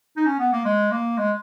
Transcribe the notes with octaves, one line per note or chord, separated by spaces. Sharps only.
D#4
C#4
B3
A#3
G#3
A#3
G#3